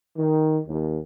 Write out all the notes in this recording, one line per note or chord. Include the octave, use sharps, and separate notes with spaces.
D#3
D#2